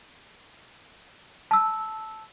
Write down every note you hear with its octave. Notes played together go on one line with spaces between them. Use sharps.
A5 E6